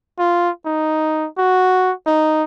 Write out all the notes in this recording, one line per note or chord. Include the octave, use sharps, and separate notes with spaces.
F4
D#4
F#4
D#4